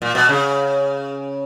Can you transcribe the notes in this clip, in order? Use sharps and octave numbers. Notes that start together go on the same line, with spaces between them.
A#2
B2
C#3